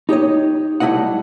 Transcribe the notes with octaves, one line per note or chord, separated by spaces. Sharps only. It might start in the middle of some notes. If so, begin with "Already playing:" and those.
D#4 G4 C#5 D#5
B1 G3 A3 E4 D#5 F#5